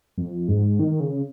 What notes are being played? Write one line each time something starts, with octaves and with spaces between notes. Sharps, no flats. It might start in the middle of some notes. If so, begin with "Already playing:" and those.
F2
G#2
D#3
C#3